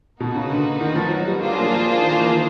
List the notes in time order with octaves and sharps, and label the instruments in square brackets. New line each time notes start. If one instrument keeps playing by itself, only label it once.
[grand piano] B2 [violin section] A#3 D#4 F#4 B4
[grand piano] C#3
D3
D3
D#3
F3
F#3
G3
[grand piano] G3 [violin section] A#3 D4 F4 G#4 C5
[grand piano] F#3
F3
F3
D#3
E3
D#3